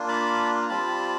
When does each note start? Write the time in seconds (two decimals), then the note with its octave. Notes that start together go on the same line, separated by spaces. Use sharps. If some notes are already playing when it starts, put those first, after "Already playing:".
Already playing: A#3 D4 F4
0.08 A5 B5
0.62 A#5
0.69 G3 C4 F4 A5 B5